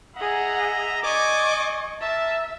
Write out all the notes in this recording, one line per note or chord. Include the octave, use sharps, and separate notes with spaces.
G#4 D#5 E5 F#5 A#5
D5 D#5 G#5 C#6 D6
A#4 E5 A5